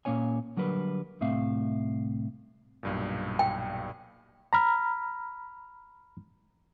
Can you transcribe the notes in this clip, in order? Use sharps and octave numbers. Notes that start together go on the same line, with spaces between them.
A#2 A#3 C#4 C#5 G#5
D3 F#3 G3 A#4 B4
C2 A2 A3 C4 E5 F5
B1 G2 A#2
G5
A#5 B5 F6